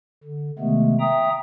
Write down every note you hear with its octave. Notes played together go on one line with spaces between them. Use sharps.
D3
C3 D#3 G#3 A3 B3
E5 G5 A#5 D#6